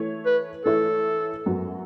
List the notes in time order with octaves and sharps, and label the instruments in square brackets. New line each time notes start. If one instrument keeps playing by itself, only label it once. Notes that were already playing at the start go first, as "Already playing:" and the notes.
Already playing: [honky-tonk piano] E3 A3 E4 C#5
[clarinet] B4
[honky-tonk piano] E3 A3 E4 C#5 [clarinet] A4
[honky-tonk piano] F#2 F#3 B3 F#4